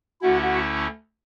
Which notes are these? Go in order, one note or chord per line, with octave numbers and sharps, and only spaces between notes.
D2 D3 A3 C#4 E4 F#4 F#5
F#4 F#5